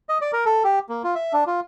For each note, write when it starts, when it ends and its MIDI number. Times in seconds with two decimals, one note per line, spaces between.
0.09 0.18 75
0.21 0.31 74
0.33 0.44 70
0.46 0.63 69
0.64 0.79 67
0.89 1.02 58
1.04 1.14 65
1.15 1.33 76
1.33 1.44 62
1.47 1.60 65